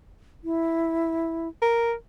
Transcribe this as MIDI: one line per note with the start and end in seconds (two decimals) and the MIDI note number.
0.44 1.48 64
1.62 1.94 70